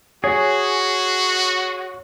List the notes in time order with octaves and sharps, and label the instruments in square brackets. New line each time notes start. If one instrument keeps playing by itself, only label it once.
[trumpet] F#4 [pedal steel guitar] G#4 [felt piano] C#5